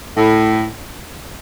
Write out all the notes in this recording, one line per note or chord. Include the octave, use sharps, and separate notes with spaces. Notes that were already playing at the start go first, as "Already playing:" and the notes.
A2